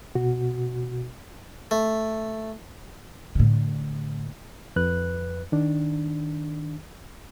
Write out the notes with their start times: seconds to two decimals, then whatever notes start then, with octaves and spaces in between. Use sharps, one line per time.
0.15 B2 F#4
1.71 A3
3.35 A2 D3
4.76 F2 B4 F#6
5.52 D#3 D4